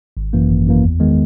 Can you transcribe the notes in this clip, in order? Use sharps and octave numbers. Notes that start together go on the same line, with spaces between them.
G#1
F#2 E3 A#3
G#1
F#2 E3 A#3
E2
D#3 G#3 B3